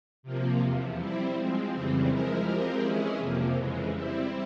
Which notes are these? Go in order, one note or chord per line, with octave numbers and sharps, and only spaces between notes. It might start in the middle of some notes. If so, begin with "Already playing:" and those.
C3 F3 A#3
E2 C3 F3
G3 C4 E4
F3 G#3 C4
F2 C#3 E3 G3 C4
F3 G#3 E4 A#4
F3 G#3 C4 G4 A#4
E3 G#3 C#4 E4 G#4
F2 C3 F3 A#3
F2 C#3 E3 G#3
G3 C4 E4